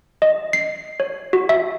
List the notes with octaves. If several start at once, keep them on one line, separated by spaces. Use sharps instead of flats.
D#5
C7
C#5
F#4
E5